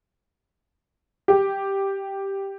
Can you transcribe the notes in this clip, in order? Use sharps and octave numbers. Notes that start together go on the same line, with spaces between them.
G4